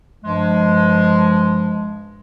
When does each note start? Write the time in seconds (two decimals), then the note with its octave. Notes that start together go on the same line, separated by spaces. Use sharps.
0.24 G2 F3 G#3